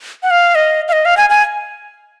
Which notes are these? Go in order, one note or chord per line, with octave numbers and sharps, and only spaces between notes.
F#5
F5
D#5
F5
D#5
F5
G#5
G#5